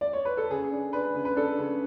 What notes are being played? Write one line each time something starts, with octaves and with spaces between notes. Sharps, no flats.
D5
C#5
B4
A4
C#3 G#4
D4
D4 B4
C#3
B4
D4 A4
C#3